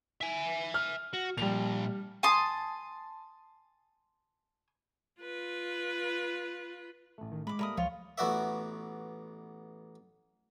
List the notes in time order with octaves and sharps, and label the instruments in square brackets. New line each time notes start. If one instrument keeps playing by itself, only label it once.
[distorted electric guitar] E5 G#5
[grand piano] F6
[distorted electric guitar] F#4
[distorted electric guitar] A#2 F3 [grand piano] G3 F7
[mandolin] G#5 A5 C6 D#6
[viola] F4 B4
[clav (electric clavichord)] A1 A3
[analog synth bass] D#3
[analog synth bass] G#3 [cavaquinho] B5 D6
[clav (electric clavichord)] G3 A3 A#3 [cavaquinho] A#4 B5 D#6
[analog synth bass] C#2 [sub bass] F3 [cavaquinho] F4 C#5
[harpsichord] A1 B3 F#4 D5 E5